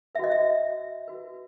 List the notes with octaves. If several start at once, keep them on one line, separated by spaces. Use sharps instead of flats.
F#4 B4 D#5 E5
E5
F#4 B4